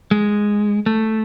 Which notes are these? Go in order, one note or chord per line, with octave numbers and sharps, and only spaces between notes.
G#3
A3